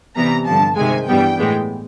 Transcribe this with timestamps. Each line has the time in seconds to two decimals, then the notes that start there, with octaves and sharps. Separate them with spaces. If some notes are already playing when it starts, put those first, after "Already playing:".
0.15 C3 E3 G3 B3 A#5
0.46 G2 D3 F3 A5
0.76 C3 D#3 G#3 G#5
1.07 G2 E3 G3 B3 G5
1.38 A2 E3 G#3 B3